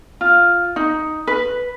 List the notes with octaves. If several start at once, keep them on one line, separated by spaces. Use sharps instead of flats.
F4
D#4
B4